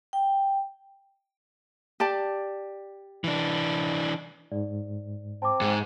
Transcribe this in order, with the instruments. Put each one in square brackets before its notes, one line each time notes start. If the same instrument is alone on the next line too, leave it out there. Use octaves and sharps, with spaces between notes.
[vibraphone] G5
[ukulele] G4 D5 A5
[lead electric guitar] E3 D4
[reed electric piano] G#2 [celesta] D5
[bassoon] C4 [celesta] A5 D6
[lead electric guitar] G#2